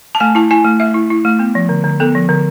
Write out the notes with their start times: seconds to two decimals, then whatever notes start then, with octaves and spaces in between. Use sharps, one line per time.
0.15 A5
0.20 A3 G#5
0.35 E4 A5
0.51 E4 G#5
0.64 A3
0.80 A3 E5
0.94 E4
1.10 E4
1.25 A3
1.39 B3
1.55 F3
1.69 D3
1.84 D3
2.00 B3 A4
2.15 F3
2.29 D3